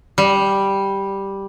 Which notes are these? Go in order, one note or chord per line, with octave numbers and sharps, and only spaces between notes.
G3